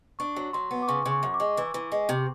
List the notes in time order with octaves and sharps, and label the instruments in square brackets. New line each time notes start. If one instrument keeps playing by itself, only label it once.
[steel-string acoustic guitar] D4 [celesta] C#6
[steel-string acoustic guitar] F#3
[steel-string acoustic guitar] F#3 [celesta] C6
[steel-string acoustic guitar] B3
[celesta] D6
[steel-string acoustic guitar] C#3 [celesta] C#6
[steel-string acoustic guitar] C#3
[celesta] C#6
[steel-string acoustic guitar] F#2
[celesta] D6
[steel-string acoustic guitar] G#3
E3
E3
G#3
C3